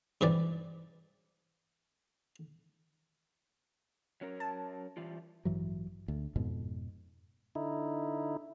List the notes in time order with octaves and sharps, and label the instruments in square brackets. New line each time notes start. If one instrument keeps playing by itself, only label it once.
[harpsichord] G2 C3 E3 D5
[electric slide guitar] F#3 C#4 A#4
[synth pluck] A5
[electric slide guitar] E3 G3 F4
[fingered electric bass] A1 G2 E3 F#3
D2
F2 G#2 B2
[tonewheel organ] D3 D#4 E4